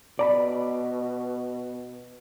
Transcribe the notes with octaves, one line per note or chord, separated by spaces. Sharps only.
B2 D5 A#5 B5